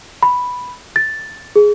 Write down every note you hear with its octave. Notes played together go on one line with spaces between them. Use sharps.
B5
A6
G#4